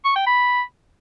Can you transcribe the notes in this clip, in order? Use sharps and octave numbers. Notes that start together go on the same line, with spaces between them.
C#6
G5
B5